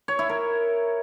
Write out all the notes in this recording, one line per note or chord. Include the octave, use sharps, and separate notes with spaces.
C#5
E4
A#4